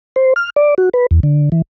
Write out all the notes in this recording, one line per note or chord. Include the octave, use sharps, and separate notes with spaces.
C5
F6
D5
F#4
B4
E2
D3
E3